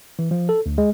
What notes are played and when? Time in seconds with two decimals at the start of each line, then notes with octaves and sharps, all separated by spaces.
0.19 E3
0.31 F3
0.49 A4
0.66 D2
0.78 G#3